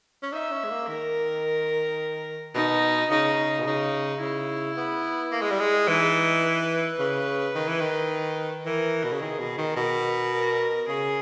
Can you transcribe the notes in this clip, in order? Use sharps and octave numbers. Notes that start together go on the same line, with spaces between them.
C#4
D#4 E5
C#4
G#3
A#3
D#3 A#4
B2 D#4
C#3 D#4
B2
C#3 D#4
C#3 E4
B3
A#3
G#3
G3
G#3
E3 D#4
B4
C#3 B4
D#3
E3
D#3
E3 A#4
B2
C#3
D#3 G#4
B2
D#3
B2 A#4
A#4
C#3 G#4